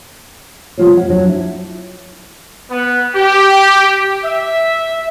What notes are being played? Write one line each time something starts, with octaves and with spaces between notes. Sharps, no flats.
C3 G3 B3 F4 C5 C#5
C#5 F#5
F#3 D4 F#4 C#5
E4
B3
G4
E5